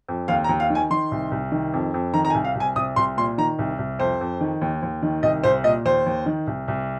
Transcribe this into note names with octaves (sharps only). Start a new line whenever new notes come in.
F2
D#2 F5
A#5
D#2
F5
D#3
G#5
D#3 C6
C2
C2
D#3
F2
F2
D#3 A#5
A#5
G#5
C2
F5
C2
G#5
C2 D#6
C2 C6
A#2 C6
D#3 A#5
C2
C2
F2 C5
F2
D#3
D#2
D#2
D#3
C2 D#5
C2 C5
A#2 D#5
D#2 C5
D#2
D#3
C2
C2